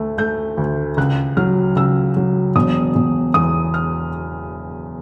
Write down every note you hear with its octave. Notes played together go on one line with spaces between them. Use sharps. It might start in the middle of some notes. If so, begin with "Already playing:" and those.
Already playing: D2 A3
A3 G6
D2
C#2 F#6
F#3 F6
C#2 E6
F#3
E1 D#6
E1
E2 D#6
F6